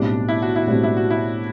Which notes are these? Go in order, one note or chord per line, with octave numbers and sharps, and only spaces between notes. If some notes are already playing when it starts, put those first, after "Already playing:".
Already playing: B1 A2 G3 C4 D4
E4
F#4
E4
B1 A2 G3 C4 F#4
E4
F#4
E4